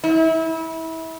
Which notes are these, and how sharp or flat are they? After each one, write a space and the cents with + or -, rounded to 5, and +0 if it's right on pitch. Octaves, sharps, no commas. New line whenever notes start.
E4 -25